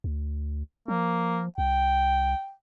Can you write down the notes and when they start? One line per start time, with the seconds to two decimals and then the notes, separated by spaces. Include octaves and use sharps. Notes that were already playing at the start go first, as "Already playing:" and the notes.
0.04 D2
0.88 F3 A#3
1.58 C2 G5